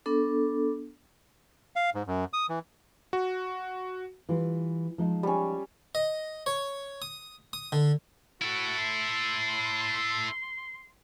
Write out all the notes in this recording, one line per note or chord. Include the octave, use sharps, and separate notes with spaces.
B3 D4 A4
F5
G#2
F#2
D#6
E3
F#4
E3 G3 F4
F3 G#3 D#4
G3 C#4
D#5
C#5
D#6
D#6
D3
E4 F#4 A4
C6